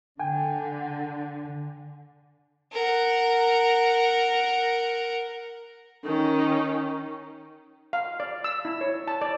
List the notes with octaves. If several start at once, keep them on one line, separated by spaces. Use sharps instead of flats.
D3 G5 G#5
A#4 F#5
D#3 C#4
F5
D5
E6
E4
C#5
A5
D5